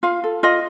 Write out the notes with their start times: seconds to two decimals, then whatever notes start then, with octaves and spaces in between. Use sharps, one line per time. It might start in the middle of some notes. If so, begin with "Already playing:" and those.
0.03 F4 F5
0.24 A4
0.43 F4 D#5